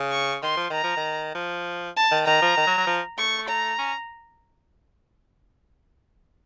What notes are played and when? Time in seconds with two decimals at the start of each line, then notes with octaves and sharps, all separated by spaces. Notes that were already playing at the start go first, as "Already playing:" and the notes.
Already playing: C#3
0.11 C#6
0.43 D#3 C6
0.57 F3
0.70 D#3 A#5
0.84 F3
0.97 D#3
1.35 F3
1.96 A5
2.11 D#3
2.26 D#3 A#5
2.42 F3
2.57 D#3
2.67 F#3
2.78 F#3
2.87 F3
3.18 A3 C#6
3.48 A#5
3.78 C#4